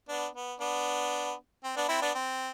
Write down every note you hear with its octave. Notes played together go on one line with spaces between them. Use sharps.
B3 D4
B3
B3 D4
C4
B3 D4
C4 E4
B3 D4
C4